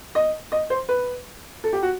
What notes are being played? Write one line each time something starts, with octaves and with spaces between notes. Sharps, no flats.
D#5
D#5
C5
B4
A4
G4
F#4